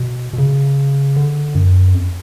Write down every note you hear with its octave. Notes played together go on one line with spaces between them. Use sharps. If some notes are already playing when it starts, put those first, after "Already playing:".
Already playing: B2
B2
C#3
D3
F#2
F2